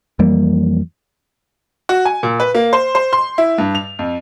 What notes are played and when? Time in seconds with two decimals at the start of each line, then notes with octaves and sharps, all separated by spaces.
0.19 F2 E3 G3 A#3
1.89 F#4
2.05 G#5
2.23 A#2
2.40 B4
2.55 A#3
2.73 C5
2.95 C5
3.13 C6
3.38 E4
3.58 G2
3.75 F7
3.99 F2